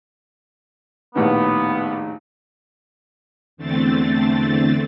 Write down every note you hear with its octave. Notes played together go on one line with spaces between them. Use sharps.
A#1 D#2 A2 B3
E2 D3 A3 C4 A6